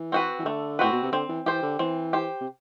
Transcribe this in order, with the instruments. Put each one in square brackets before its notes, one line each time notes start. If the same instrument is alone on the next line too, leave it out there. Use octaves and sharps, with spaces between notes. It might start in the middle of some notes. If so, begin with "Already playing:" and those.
Already playing: [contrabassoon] E3
[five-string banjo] C4 F#4 B4
[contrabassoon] E3
[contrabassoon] D3 [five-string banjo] A3
[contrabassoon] A2 [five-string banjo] C4 F#4 B4
[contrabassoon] B2
C3
[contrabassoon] D3 [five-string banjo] C4
[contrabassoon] E3
[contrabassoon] E3 [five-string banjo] G4 C5
[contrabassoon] D3
[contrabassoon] E3 [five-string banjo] C4
[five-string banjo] G4 C5
[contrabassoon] C3